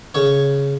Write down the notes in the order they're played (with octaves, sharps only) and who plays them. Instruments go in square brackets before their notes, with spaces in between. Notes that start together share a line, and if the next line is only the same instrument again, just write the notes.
[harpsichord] C#3 C#5